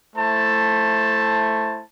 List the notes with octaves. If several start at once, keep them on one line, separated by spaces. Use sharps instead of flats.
A3 E4 C5 A5